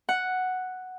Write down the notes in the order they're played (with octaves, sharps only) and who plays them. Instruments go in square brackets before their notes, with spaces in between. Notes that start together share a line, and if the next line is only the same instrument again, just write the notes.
[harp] F#5